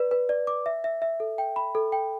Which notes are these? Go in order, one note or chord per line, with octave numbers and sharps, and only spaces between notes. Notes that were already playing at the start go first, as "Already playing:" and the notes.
Already playing: B4 D5
B4
D5
D6
E5
E5
E5
A4
G5
B5
A4
G5